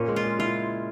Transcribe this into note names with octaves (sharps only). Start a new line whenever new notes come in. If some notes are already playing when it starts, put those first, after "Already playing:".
Already playing: A#2 A#3 C#4
G#3
F4
G#4
E4 F4